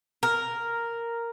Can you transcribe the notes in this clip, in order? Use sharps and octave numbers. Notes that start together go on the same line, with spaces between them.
A#4